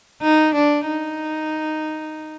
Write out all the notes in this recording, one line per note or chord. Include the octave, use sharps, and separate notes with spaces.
D#4
D4
D#4